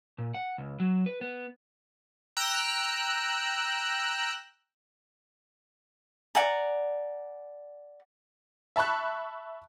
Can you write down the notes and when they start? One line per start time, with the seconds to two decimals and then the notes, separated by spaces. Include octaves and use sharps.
0.18 A#2
0.34 F#5
0.58 C#2
0.80 F#3
1.06 B4
1.21 B3
2.37 G5 A#5 E6 F#6
6.35 D5 F#5 G#5 A#5
8.76 E5 A5 B5 C#6 F#6